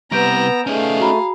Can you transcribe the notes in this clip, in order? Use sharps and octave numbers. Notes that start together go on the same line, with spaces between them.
C3 G3 B3 B4 A#5 E6 G6 D7
A3 C#4 D#4 G#4 F5
F#4 A#5 B5